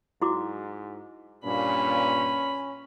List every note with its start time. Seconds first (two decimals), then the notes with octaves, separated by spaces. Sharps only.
0.22 G#2 E4 F#4 D6
1.44 G2 A#2 C#4 B5